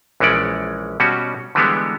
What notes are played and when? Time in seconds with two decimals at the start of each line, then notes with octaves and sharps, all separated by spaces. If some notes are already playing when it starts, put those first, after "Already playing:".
0.20 A#1 E3 G#3 C#4 D5
1.00 B2 G3 C#4 F#4
1.55 D3 E3 G3 G#3 B3